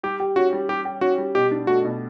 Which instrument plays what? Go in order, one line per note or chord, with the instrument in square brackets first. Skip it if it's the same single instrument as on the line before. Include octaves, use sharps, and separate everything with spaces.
[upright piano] G3 [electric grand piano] G4
[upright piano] G4
[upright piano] C#4 [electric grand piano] F#4
[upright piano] G3
[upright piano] G3 [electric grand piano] G4
[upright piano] G4
[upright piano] C#4 [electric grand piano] F#4
[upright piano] G3
[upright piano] B2 [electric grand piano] G4
[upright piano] D4
[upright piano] A3 [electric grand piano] F#4
[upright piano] B2